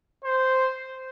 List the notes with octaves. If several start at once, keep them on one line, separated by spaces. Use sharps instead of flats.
C5